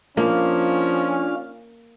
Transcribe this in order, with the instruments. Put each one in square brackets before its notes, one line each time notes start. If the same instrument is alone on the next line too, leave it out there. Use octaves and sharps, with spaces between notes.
[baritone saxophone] F3 [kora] A#3 [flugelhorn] C#4 [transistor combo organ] D4 F4 F5